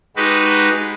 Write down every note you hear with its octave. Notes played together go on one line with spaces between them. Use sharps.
G#3 D#4 F#4 G4 B4